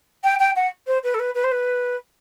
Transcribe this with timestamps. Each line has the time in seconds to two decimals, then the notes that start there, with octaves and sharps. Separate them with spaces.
0.23 G5
0.39 G5
0.55 F#5
0.87 C5
1.03 B4
1.14 A4
1.19 B4
1.34 B4
1.43 C5
1.51 B4